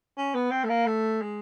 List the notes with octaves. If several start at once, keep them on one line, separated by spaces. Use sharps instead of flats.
C#4
B3
C4
A3
A#3
A3
G#3